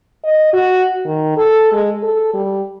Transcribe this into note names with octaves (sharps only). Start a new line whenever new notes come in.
D#5
F#4
D#3
A4
G#3
A4
G3